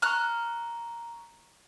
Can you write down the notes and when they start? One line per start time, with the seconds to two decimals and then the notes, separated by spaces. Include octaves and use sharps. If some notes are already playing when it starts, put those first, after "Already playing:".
0.02 A#5 C#6 F6 F#6